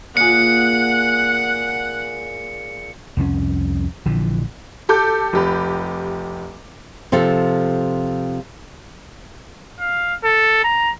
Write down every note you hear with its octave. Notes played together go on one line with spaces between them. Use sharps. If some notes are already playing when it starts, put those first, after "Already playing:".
A#2 G#4 F#5 C#7
C2 F2 G#3 C#4
A#1 D3 E3 F3
G4 A4 D6 G6
F1 G4 B5
C3 F3 F4 A4
F5
A4
A#5